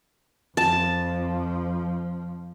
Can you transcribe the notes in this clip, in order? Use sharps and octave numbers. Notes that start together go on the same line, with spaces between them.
F2 F3 A5